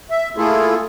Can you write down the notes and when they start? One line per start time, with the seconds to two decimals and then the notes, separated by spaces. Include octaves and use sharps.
0.10 E5
0.37 A3 A#3 E4 F4 G#4 A4